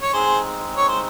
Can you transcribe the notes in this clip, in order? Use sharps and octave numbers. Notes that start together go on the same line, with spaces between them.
C#5
G#3 C4 D#4 G#4 C5
C#5
C5